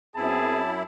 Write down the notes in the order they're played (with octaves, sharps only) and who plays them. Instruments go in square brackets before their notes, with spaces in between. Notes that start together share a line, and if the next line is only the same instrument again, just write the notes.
[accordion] F#2 E4 [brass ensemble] B3 C4 G#4 [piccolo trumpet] A5